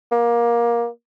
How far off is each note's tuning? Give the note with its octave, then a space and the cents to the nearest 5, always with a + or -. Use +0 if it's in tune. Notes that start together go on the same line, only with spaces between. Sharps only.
A#3 +20